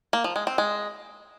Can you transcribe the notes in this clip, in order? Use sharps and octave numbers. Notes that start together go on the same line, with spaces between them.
A#3
F3
G#3
C4
G#3